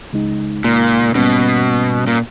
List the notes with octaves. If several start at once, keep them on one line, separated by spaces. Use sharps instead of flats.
C#2 C#3 G#3 D#4
A#2
G#2 B2 G3 A#3 C#4
A#2